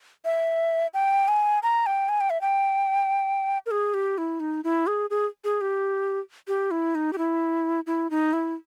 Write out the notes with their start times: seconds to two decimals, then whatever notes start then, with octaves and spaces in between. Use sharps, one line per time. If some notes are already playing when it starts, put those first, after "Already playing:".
0.25 E5
0.94 G5
1.28 G#5
1.63 A#5
1.86 G5
2.09 G#5
2.21 G5
2.30 E5
2.41 G5
3.66 A#4
3.71 G#4
3.94 G4
4.18 E4
4.40 D#4
4.64 E4
4.87 G#4
5.10 G#4
5.44 G#4
5.61 G4
6.48 G4
6.71 E4
6.95 D#4
7.13 G4
7.18 E4
7.87 E4
8.11 D#4
8.33 E4